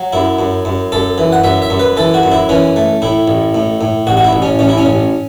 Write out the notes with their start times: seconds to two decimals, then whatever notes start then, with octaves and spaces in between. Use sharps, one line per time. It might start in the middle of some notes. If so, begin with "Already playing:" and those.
Already playing: F#3
0.13 F#2 E4
0.39 F#2
0.65 F#2
0.92 F#2 A4
1.18 E3
1.32 F#5
1.44 F#2 E5
1.62 E5
1.70 F#2
1.79 B4
1.97 E3 A4
2.14 F#4
2.23 F#2
2.32 E4
2.49 E3 C#4
2.76 A3
3.02 A2 E4
3.28 A1
3.55 A2
3.81 A2
4.07 A1 F#4
4.17 F#4
4.24 E4
4.33 A1
4.42 C#4
4.59 A1 C#4
4.69 E4
4.78 C#4
4.86 A1